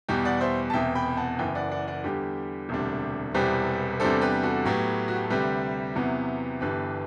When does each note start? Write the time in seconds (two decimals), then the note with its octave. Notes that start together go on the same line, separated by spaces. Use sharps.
0.09 E2 B2 G3 G4
0.25 D5 F#5
0.40 C5 E5
0.70 A5
0.73 E1 E2 C3 E5 G5
0.95 G5 B5
1.17 F#5 A5
1.39 F#1 F#2 E3 E5 G5
1.55 D5 F#5
1.71 D5 F#5
1.87 D5 F#5
2.04 E2 D3 G3 G4
2.69 E1 D2 C3 G3 D4
3.34 E1 E2 C3 G3 C4 G4 B4
4.00 E2 C3 G3 D4 A4 C5
4.21 G4 B4
4.43 F#4 A4
4.65 A2 F#3 B3 G4
5.08 F#4
5.15 G4
5.23 A4
5.30 D2 C3 G3 G4 B4
5.95 E2 C3 F#3 B3 E4
6.61 G1 G2 E3 B3 G4 B4